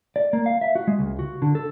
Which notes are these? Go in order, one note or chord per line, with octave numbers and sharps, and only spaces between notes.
D5
A#3
F5
E5
F#4
G#3
C#2
F#4
D3
A4